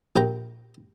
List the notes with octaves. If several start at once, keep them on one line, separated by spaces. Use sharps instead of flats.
A#1 G4 A#4 G5 A#5